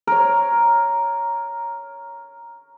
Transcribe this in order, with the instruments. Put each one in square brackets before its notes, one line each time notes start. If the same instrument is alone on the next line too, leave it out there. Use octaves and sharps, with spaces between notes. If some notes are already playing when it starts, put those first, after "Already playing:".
[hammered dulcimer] A#4 C#5